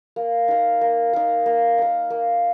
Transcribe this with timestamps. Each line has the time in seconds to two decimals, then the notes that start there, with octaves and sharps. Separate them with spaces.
0.16 A#3
0.48 D#4 A#4
0.81 A#3
1.13 D#4 A#4
1.46 A#3
1.78 D#4 A#4
2.10 A#3